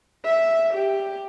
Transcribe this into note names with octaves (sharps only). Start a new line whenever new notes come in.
E5
G4